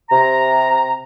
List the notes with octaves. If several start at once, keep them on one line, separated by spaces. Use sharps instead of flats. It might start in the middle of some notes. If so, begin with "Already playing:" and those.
C3 A#5